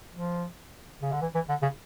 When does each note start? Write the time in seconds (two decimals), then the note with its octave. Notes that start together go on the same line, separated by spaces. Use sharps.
0.12 F3
1.02 C#3
1.12 D3
1.21 E3
1.35 E3
1.49 D3
1.62 C#3